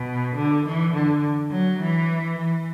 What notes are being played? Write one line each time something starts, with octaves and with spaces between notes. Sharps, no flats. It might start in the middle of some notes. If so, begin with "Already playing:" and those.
Already playing: B2
D3
E3
D3
F#3
E3
E3